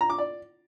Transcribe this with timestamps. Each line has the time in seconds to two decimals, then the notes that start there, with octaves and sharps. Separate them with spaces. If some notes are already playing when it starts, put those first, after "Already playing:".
0.01 A#5
0.10 D6
0.18 D5